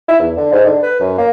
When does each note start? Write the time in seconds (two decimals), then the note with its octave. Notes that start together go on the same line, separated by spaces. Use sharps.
0.08 E4
0.20 E2
0.37 D3
0.52 G#2
0.65 D3
0.83 B4
1.00 F#2
1.18 A#3